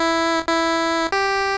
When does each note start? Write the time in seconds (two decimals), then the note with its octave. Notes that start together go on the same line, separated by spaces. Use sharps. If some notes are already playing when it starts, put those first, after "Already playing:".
Already playing: E4
0.47 E4
1.12 G4